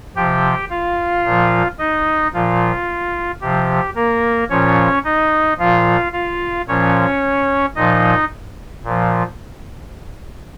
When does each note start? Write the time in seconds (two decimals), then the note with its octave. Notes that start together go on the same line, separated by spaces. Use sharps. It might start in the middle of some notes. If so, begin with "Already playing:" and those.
0.16 C3 F3 G4 G5
0.70 F4 F5
1.25 A#2 F3
1.78 D#4 D#5
2.34 A#2 F3 F4
3.41 C3 F3 G4
3.95 A#3 A#4
4.50 A#2 F3 C#4 C#5
5.04 D#4 D#5
5.58 A#2 F3 F4 F5
6.13 F4 F5
6.67 A#2 F3 C#4 C#5
7.76 A#2 F3 D#4 D#5
8.84 A#2 F3